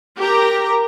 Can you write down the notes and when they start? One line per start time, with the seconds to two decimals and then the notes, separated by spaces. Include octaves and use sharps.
0.18 G4 A#4 A#5